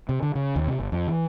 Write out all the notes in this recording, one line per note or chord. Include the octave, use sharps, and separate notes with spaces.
C3
D3
C#3
D#2
C3
G1
F2
E3